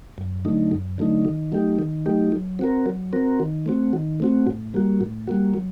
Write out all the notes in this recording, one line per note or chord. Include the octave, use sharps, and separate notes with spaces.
F#2
D3 F#3 A3 D#4
F#2
D3 F#3 A3 D#4
D#3
F#3 A3 D#4 G4
D#3
F#3 A3 D#4 G4
F#3
C4 F#4 A#4
F#3
C4 F#4 A#4
D#3
A3 C4 F#4
D#3
A3 C4 F#4
A2
G3 A#3 F#4
A2
G3 A#3 F#4
F#3